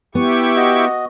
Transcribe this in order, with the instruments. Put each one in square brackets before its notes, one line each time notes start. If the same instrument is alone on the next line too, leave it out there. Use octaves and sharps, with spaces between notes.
[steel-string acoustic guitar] B3 [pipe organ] E4 G4 C#6
[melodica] F#4 D#5